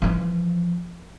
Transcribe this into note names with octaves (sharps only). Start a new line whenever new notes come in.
E3 F3